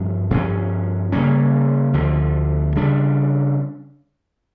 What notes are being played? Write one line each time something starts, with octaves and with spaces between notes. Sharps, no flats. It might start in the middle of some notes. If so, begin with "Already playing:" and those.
Already playing: G2 F3 C#4
G2 F3 C#4
C#3 G3 A#3 C#4
D2 D3 F3
C#3 G3 D4